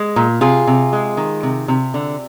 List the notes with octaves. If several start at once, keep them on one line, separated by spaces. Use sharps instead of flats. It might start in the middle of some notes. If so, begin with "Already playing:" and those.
Already playing: G#3
A#2
C3 F4 G#4
C3
G#3
D#3
C3
C3
D3